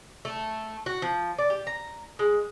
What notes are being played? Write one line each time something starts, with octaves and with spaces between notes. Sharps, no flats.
A3
F#4
F3
D5
G4
A#5
G#3